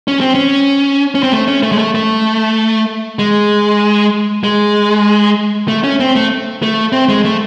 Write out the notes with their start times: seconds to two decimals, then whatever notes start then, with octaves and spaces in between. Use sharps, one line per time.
0.08 C#4
0.20 C4
0.35 C#4
1.15 C#4
1.23 C4
1.32 A3
1.48 C#4
1.63 A3
1.72 G#3
1.78 A3
1.95 A3
3.19 G#3
4.44 G#3
5.68 A3
5.84 C#4
6.00 C4
6.16 A3
6.63 A3
6.93 C4
7.09 G#3
7.25 A3